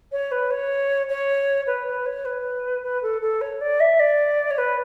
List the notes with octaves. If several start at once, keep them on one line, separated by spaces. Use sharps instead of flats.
C#5
B4
C#5
C#5
B4
B4
C#5
B4
B4
A4
A4
C#5
D5
E5
D5
C#5
B4